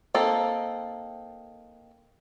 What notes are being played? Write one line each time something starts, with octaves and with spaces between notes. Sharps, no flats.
A#3 C4 D#4 A4